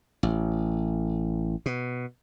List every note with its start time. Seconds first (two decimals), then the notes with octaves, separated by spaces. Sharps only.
0.23 A1
1.66 B2